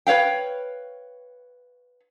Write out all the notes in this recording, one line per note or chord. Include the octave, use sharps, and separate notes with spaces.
B4 C#5 F5 G5